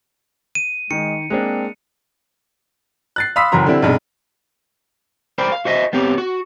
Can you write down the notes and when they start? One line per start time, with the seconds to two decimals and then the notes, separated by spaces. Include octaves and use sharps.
0.55 D#7
0.91 D#3 G#3 C#7
1.30 G#3 A#3 C4 D4
3.16 F#6 A6 C7
3.36 F5 B5 C6 D#6 E6 B6
3.52 F#1 E3 F#3 A#5 C6
3.66 D3 G3 C4 E4
3.82 B1 G2 C3 G#3
5.38 A#4 C5 D5 G5 B5
5.52 F5
5.65 F#4 C5 D#5 E5
5.93 B3 C4 G4 C#5
6.18 F#4